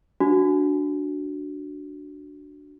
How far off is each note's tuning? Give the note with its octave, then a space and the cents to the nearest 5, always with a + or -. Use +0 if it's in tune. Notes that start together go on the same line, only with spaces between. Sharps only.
D4 +0 F#4 +0